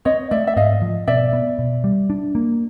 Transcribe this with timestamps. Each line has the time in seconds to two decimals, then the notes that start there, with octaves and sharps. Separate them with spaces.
0.05 C4 C#5 D#5
0.31 A3 D5 E5
0.47 E5
0.56 G#2 D#5 F5
0.82 F3
1.08 B2 D5 E5
1.33 B3
1.59 B2
1.84 G3
2.10 D4
2.35 A#3